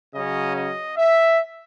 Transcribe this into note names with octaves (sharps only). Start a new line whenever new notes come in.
C#3 F#3 C#4 D#5
D#5
E5